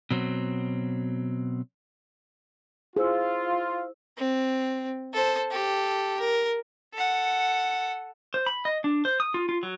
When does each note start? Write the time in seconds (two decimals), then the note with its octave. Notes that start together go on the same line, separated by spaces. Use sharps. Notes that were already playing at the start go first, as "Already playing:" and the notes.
0.11 B2 F#3 C4
2.96 E4 F4 G#4 C5 E6
4.18 C4
5.14 A4 C5
5.51 G4 A4
6.19 A#4
6.93 A4 F#5
8.34 C5
8.46 B5
8.65 D#5
8.84 D4
9.05 C5
9.20 D#6
9.34 F4
9.49 F4
9.63 F#3